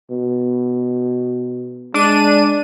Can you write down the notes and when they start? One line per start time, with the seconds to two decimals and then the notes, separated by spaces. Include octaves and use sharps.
0.10 B2
1.94 G#3 D4 D#7